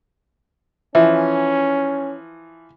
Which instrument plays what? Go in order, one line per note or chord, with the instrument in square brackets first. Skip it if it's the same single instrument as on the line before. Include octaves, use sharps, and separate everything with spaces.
[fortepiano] E3 F3 [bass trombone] C#4 [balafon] E5